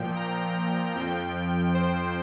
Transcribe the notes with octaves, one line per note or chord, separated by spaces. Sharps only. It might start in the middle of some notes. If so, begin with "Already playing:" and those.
Already playing: A#2 F3 G5
A#5
F2 F3 G5
C5